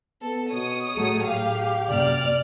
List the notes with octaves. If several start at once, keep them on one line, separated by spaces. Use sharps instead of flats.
B3 A4
B2 C#5 D#6
A2 F#3 A3 G#4
A2 G4 F5
F#2 C3 A#3 D5 F6